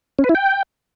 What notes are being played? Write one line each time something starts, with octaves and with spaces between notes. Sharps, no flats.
C#4
B4
E4
G5